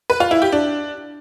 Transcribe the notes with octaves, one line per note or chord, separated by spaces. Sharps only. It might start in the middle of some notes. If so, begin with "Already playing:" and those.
B4
F4
E4
G4
D4